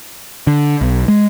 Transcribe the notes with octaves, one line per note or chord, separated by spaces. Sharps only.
D3
B1
G#3